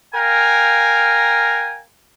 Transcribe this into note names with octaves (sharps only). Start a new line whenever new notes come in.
A#4 F5 G5 G#5 A#5